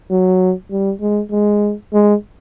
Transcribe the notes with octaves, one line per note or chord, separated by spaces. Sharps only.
F#3
G3
G#3
G#3
G#3